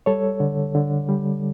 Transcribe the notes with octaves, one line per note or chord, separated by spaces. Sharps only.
G3 A4 C#5
D3
D3
G3